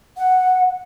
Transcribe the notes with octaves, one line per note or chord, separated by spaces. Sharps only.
F#5